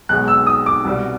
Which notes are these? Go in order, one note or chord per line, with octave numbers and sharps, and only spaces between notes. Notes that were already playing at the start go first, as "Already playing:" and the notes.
B1 B2 G#3 F#6
E6
D#6
D6
C2 B2 G3